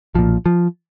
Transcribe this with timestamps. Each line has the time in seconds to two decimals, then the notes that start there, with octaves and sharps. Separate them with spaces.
0.15 B1 A#2 F3
0.46 F3